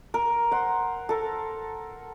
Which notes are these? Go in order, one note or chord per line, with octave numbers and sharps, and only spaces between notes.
A#4
C5 F#5
A4 A#4